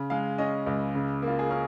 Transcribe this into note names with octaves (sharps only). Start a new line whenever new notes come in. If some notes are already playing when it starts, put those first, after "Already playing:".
Already playing: C#3
G#3 F5
C#4 D#5
C#2
C#3
A#3
F4
G#4
C#4 A#4